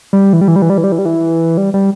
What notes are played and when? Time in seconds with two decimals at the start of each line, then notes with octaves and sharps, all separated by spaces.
0.13 G3
0.33 E3
0.41 G3
0.48 E3
0.56 G3
0.62 E3
0.70 G3
0.78 E3
0.84 G3
0.92 E3
0.99 G3
1.05 E3
1.57 G3
1.74 G3